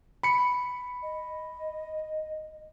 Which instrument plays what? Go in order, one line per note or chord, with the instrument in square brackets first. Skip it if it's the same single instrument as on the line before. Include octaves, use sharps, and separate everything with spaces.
[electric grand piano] B5 C#7
[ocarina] D#5